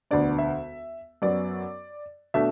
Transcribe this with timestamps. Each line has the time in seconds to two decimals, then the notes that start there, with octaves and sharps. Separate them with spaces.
0.11 E1 D2 D3 B3 D4 D5
0.38 E5
1.22 F#2 F#3 B3 D5
2.34 B2 A3 D4 E5